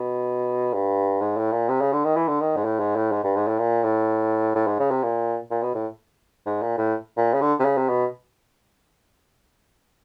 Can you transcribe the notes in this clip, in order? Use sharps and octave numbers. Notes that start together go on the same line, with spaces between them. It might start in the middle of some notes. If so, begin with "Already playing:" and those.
Already playing: B2
G2
G#2
A2
A#2
C3
C#3
D3
D#3
E3
D3
D#3
G#2
A2
G#2
A2
G#2
G2
G#2
A2
A#2
A2
A2
G#2
C#3
C3
A#2
A#2
B2
A2
G#2
A#2
A2
A#2
C#3
D3
C3
C#3
C3
B2